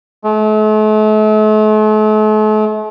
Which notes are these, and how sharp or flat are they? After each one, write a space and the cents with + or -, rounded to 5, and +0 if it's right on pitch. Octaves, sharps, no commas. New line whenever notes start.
A3 -45